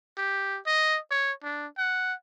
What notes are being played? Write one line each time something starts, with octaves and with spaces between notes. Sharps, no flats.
G4
D#5
C#5
D4
F#5